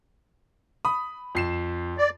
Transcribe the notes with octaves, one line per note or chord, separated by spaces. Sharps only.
B5 D#6
F2 C7 E7
D5